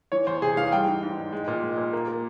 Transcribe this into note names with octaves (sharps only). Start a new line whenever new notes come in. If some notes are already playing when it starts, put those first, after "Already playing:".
E3 C#5
E2 C5
C3 G#4
E3 F5
G3 G5
G#2
G#2
G#2
G#3
A#2
G#3
A#2
A#3
A#3